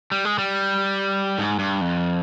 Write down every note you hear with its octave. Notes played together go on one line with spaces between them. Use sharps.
G3
G#3
G3
G#2
G2
F2